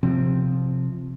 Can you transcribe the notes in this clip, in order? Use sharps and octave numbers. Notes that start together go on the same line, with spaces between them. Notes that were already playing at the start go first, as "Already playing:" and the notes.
C3 F3 C4